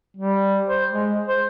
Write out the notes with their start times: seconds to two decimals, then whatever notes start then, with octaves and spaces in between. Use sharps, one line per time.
0.17 G3
0.67 C5
0.90 G#3
1.28 C5